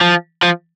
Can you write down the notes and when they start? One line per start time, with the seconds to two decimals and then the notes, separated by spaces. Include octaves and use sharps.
0.01 F3
0.43 F3